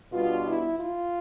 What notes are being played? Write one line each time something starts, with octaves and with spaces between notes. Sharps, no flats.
B2 G3 B3 D4 F4
E4
F4